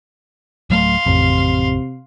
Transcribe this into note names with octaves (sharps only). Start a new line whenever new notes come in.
D1 F#3 A3 F5 C6
A1 F2 C3